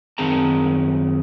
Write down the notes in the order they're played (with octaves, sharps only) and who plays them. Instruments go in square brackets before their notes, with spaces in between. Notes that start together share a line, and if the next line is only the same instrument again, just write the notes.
[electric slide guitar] F#2 D#3 C4 G#4 A5 A#5